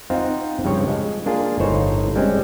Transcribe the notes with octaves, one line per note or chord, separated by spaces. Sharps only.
C4 D#4 F4 F5 F#5
G2 C#3 F3 C#5 G5
G#3
A#3 D4 F4 G#4 A#4
G1 A2 D#4 C5 C#5 A#5
G3 G#3 C4 C#4